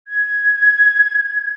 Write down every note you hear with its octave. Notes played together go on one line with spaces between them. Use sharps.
G#6